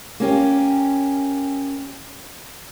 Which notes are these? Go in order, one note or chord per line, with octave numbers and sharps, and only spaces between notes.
A#3 C#4 G4